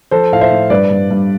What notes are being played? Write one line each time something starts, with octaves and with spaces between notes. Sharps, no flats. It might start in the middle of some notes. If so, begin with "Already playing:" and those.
F3 A4 C5
A2 F5
C5 E5
A2
G2 B4 D5
G2
G2